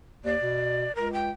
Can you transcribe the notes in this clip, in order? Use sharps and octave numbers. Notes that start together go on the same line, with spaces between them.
D#2 D5
B2
C#2 A#4
G5